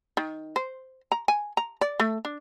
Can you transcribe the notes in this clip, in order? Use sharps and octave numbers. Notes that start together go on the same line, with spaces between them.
D#3
C5
A#5
G#5
A#5
D5
A3
D4